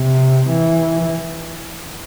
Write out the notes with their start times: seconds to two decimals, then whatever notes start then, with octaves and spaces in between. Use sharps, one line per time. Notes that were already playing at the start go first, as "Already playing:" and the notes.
Already playing: C3
0.50 E3